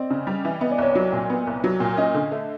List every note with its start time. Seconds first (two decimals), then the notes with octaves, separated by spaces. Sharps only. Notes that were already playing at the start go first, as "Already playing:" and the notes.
Already playing: C4 D5 D#5
0.10 C#3
0.27 G3
0.45 E3
0.61 B3 D#5
0.71 D5
0.78 C2 C#5
0.93 F#3 D5
1.12 A#2
1.30 B3
1.47 C2
1.64 F#3
1.80 A#2
1.97 C#4 D#5
2.14 D3
2.31 A3